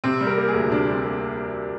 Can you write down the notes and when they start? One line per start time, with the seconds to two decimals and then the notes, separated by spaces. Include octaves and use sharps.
0.04 C3 C4
0.21 G3
0.27 A#4
0.38 A#3
0.48 G#4
0.54 D2
0.71 C3 D4
0.87 G3
0.94 C4
1.05 A#3